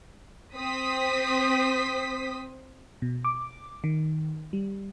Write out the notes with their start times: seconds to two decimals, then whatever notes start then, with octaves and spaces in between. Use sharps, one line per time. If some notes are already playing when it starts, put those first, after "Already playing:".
0.55 C4 C5 D#6 B6
3.02 B2
3.25 D6
3.84 D#3
4.53 G3